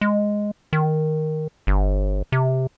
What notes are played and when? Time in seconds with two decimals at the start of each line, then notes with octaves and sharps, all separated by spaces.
0.01 G#3
0.73 D#3
1.67 G1
2.32 C3